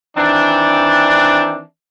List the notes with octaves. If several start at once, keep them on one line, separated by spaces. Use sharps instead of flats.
D#3 E3 C4 D4